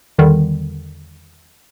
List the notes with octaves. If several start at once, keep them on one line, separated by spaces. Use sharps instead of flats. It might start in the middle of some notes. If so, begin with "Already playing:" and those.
E2 D3 D#3 G3